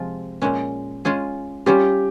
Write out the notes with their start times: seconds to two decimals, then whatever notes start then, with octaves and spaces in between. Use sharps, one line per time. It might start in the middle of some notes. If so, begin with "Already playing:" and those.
Already playing: C3 F3 G#3 C4 F4
0.42 A#2 G#3 C#4
1.05 G#3 C#4 F4 G#4
1.66 G3 C#4 F4 G4